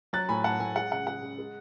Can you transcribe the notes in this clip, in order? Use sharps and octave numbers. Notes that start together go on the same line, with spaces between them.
F#3 F#6 A6
A2 G#5 B5
A2 F#5 A5
A2 G#5
G#3 F#5
C#3 F#5
G#3 F#5
C#3
G#3